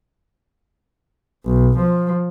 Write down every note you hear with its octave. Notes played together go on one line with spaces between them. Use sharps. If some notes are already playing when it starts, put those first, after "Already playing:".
B1
F3